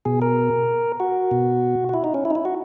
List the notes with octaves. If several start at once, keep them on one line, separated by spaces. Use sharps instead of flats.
B2 G#4
A#4
F#4
B2
F#4
E4
D#4
C#4
E4
D#4
E4
F#4